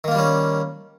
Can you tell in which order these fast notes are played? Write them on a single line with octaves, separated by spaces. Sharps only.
D#3 A#3 F4 G3 C#4